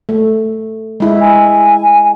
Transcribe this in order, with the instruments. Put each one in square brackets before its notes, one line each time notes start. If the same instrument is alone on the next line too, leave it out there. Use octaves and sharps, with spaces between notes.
[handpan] A3
G#3 E4
[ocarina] G#5